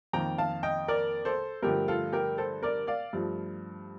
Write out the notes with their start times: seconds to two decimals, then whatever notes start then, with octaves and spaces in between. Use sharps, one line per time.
0.13 F2 D#3 A#3 G5 A#5
0.38 F5 A5
0.63 D#5 G5
0.88 A#4 D5
1.25 A4 C5
1.63 G2 D3 F3 A3 G4 A#4
1.88 F4 A4
2.13 G4 A#4
2.38 A4 C5
2.63 A#4 D5
2.87 D5 F5
3.13 G2 F3 A3